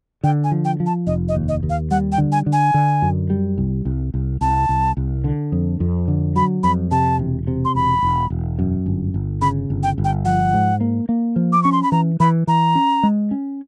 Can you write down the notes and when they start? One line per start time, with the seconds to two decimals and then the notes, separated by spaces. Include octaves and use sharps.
0.23 D3 G5
0.44 G#5
0.51 F3
0.65 G5
0.80 F3
0.86 A5
1.07 F1 D#5
1.29 D#5
1.35 D#2
1.49 D#5
1.63 D#2
1.70 F5
1.91 G3 F#5
2.12 G5
2.18 D3
2.32 G#5
2.46 D3
2.53 G#5
2.74 D3
3.02 F#2
3.30 G3
3.58 C2
3.85 C2
4.14 C2
4.41 C2 A5
4.69 C2
4.97 C2
5.24 D3
5.52 F2
5.80 F2
6.08 D3
6.36 F#3 B5
6.63 F2 B5
6.91 C3 A5
7.19 E1
7.47 C3
7.65 C6
7.75 E1 B5
8.02 E1
8.30 E1
8.59 F#2
8.86 G1
9.14 G1
9.42 C#3 B5
9.70 G1
9.83 G5
9.98 G1
10.04 G5
10.25 F3 F#5
10.54 G#2
10.81 A#3
11.09 A#3
11.36 F3
11.52 D6
11.63 C#4 C#6
11.72 C6
11.83 B5
11.92 E3 A#5
12.20 E3 B5
12.47 E3 A#5
12.75 C#4
13.03 G#3
13.31 C#4